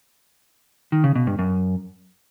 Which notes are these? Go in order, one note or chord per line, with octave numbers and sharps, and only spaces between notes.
D#3
C#3
B2
G2
F#2